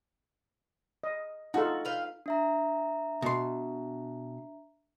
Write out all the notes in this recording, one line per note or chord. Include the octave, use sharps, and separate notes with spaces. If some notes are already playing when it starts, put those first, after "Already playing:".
D#5
D#4 F4 F#4 A4
B4 F5 G5
D4 E5 A#5
B2 C6